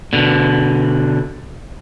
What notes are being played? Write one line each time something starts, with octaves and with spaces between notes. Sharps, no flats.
B2 D3